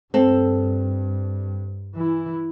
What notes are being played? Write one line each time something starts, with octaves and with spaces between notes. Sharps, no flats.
G2 C4 A4
E3 E4